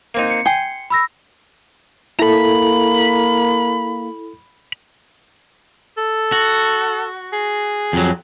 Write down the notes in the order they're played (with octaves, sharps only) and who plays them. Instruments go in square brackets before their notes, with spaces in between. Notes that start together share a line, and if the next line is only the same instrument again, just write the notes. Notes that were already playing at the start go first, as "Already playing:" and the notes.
[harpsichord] A#3 C4 D#4
[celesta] C#7
[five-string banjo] G5 G#5 [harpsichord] C6
[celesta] B5 E6 A#6
[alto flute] A#3 [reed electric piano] E4 A4 [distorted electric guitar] A#5 B5
[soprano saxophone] A4
[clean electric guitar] F#4
[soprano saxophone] G#4
[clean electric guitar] F2 F#3